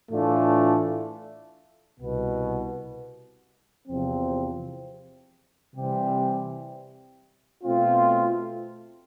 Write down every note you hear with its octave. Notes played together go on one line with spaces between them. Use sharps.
A2 E3 A3 D4 F4
C2 B2 B3
E2 C3 F3 C4
C3 E3 G3 C4 G4
B2 A3 C4 F4